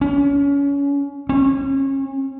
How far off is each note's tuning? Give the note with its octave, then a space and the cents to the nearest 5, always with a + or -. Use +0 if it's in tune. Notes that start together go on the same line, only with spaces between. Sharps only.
C#4 +25
C#4 -30